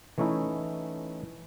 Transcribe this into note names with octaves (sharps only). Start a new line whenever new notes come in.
E3 A3 C#4 D#4 E4